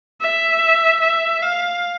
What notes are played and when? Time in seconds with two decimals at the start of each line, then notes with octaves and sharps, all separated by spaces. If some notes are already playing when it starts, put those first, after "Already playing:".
0.21 E5
1.01 E5
1.42 F5